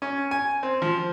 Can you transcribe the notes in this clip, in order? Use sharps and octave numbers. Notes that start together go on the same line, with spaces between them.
C#4
G#5
C4
F3